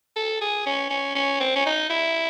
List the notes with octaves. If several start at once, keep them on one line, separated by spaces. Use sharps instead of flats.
A4
G#4
C#4
C#4
C#4
C4
C#4
D#4
E4